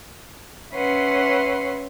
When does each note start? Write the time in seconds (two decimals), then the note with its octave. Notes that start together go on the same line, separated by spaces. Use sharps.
0.74 C#4 B4 E5 F#5 C6